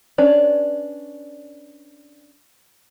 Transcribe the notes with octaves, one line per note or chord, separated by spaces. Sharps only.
C#4 D4 B4 C#5 D5